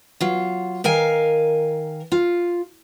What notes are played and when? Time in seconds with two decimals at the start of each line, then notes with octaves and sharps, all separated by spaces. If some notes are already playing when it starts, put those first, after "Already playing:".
0.20 F#3 F4
0.84 D#3 A#4 F5 G#5
2.12 F4